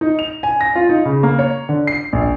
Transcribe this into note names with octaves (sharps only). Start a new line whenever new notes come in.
D#4
F7
G#5
A#6
F4
D#4
C#3
A#3
C#5
D3
C7
A#1